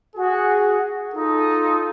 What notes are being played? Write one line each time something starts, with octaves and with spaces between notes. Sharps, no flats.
F#4 G#4
D#4 F4 A4